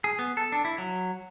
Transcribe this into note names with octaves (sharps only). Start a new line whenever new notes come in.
G#4
B3
A4
D4
E4
F#3